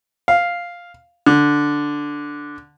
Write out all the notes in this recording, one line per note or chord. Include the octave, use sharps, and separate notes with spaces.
F5
D3